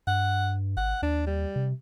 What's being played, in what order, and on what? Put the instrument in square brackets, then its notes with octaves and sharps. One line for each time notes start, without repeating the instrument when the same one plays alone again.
[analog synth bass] G2 [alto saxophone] F#5
[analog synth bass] G#1 [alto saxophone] F#5
[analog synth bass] D#2 [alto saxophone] D4
[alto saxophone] G3
[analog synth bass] C3